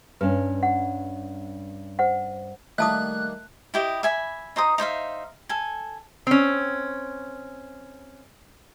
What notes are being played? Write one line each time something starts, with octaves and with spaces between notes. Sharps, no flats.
G2 C#4 B4
F#5
C5 F#5
D#3 G3 A3 A#3 E5 A5 D#6 F#6
E4 G4 D#5
E5 G#5 B5
D#4 C5 A#5 D#6
D#4 C5 E5 F5
A4 G#5
C4 C#4